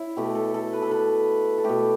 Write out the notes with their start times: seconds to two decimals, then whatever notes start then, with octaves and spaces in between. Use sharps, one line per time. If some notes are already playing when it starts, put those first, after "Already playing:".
Already playing: E4
0.17 B2 A3 G4
0.35 A4
0.54 A4
0.73 B4
0.82 A4
0.91 B4
1.58 A4
1.64 B2 A3 G4